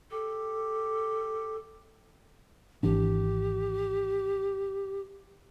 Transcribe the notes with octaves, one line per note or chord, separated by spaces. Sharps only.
G4 A4
G#1 E3 D4 G4